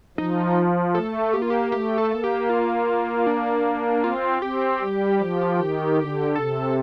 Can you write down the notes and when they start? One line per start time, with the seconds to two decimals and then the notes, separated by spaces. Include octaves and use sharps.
0.18 F3 D#4
0.95 A3 A4
1.33 A#3 G4
1.42 F4
1.50 G4
1.72 A3 G4
1.98 A4
2.11 A#3
2.24 G4
2.49 F4
3.27 D4
4.04 C4 F4
4.42 C4 G4
4.81 G3
5.20 F3
5.59 D#3
5.97 D3
6.36 C3 A4